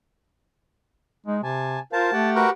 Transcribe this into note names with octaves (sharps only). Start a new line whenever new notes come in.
G#3 D#4
C3 G#5 A5
F4 A#4 C5 F5 A5
A3 G4 F#5 G5
F#4 A#4 B4